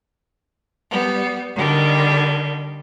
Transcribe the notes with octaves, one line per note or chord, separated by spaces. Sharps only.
G3 B3
D3 D#3 G3